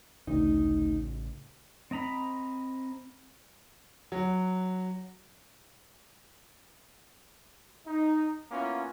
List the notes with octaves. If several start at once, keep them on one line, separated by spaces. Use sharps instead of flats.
A1 D2 C#3 D#4
C4 D#5 A#5 B5
F#3
D#4
A#3 B3 C#4 E4 F4